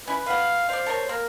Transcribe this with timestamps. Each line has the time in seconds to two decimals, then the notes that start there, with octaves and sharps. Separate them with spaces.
0.07 C#4 E4 B4
0.26 B4 F5 F#5
0.69 C5 D5 F5
0.86 A4 A#4 C#5
1.09 A#3 A#4